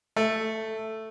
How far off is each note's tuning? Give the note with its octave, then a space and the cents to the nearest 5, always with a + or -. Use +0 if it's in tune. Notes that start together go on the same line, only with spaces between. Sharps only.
A3 +5